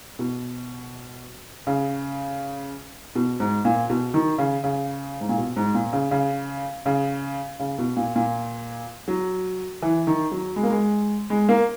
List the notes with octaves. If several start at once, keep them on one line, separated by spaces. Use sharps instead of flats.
B2
C#3
B2
G#2
A#2
B2
D#3
C#3
C#3
G#2
A#2
B2
G#2
A#2
C#3
C#3
C#3
C#3
B2
A#2
A#2
F#3
E3
D#3
F#3
G#3
A#3
G#3
G#3
A#3